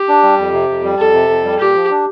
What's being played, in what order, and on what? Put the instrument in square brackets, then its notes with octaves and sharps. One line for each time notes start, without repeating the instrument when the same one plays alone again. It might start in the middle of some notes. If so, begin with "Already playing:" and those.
Already playing: [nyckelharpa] G4
[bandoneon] D4
G3
F2
C3
F2
G3
[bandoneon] F2 [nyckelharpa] A4
[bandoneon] C3
F2
G3
[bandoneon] A#2 [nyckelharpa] G4
[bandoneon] F3
D4